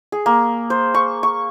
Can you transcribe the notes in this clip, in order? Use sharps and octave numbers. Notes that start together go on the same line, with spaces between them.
G#4
A#3
C5
C#6
C#6